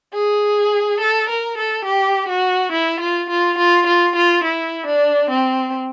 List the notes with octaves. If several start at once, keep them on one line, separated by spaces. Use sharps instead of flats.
G#4
A4
A#4
A4
G4
F#4
E4
F4
F4
F4
F4
F4
E4
D4
C4